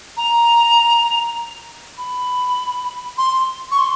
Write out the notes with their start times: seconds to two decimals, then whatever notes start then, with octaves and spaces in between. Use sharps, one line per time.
0.17 A#5
1.98 B5
3.18 C6
3.71 C#6
3.78 C6